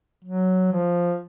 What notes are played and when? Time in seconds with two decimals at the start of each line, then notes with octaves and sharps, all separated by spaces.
0.25 F#3
0.72 F3